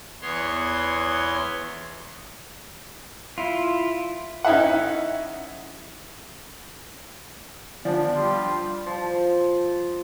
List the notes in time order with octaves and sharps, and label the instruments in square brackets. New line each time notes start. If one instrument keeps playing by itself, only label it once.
[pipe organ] E2 B3 C#5 C6
[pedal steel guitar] E4 F4
[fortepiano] C#4 D#4 E4 E5 F#5
[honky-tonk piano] F3 [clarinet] B3 [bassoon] D4
[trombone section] G3 [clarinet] F4
[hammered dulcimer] F3